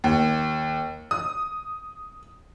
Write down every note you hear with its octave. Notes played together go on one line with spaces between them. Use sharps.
D#2
D#6